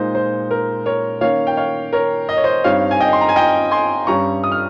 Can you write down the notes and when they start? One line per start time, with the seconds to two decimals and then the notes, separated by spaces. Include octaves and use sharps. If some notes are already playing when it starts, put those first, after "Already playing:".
Already playing: A#2 G#3 D#4 C5
0.15 C5
0.51 A#4
0.86 A#4 C#5
1.21 D#3 A#3 C#4 C#5 F5
1.47 G5
1.57 C#5 F5
1.93 A#4 C#5
2.29 D#5
2.37 C#5
2.44 C5 D#5
2.64 G2 G3 C4 D#4 C#5 F5
2.91 G#5
3.00 D#5 G5
3.13 C6
3.21 A#5
3.29 G#5
3.36 D#5 G5
3.71 G#5 C6
4.07 G2 G3 C#4 A#5 C#6
4.44 D#6
4.52 F6